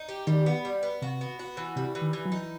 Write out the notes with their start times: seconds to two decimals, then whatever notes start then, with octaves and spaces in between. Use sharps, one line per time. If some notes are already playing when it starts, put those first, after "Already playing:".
Already playing: D#4
0.09 G4
0.27 D#3 G3
0.46 B3
0.65 G3
0.83 B3
1.02 C3 F#4
1.21 B3
1.39 F#4
1.57 E3
1.76 C3 G3
1.95 E3
2.01 D#3
2.13 E3
2.26 F#3
2.32 D#4